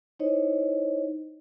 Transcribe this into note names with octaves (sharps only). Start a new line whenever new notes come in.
D#4 E4 C5 C#5 D#5